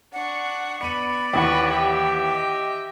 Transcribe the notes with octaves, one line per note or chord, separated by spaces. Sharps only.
D4 F#5 C#6
B3 D5 B5 C#7 D#7
D#2 E3 B4 F#5 C#6
G4 E5
D#5